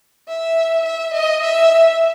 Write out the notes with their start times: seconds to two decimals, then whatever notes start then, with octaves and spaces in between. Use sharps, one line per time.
0.28 E5
0.85 E5
1.14 D#5
1.43 E5